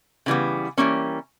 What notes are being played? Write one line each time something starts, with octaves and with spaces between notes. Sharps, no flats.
C#3 E3 G3 B3
E3 G3 A#3 C#4